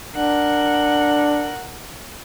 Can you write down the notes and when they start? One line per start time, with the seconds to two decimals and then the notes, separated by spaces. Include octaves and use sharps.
0.16 D4 A#4 F#5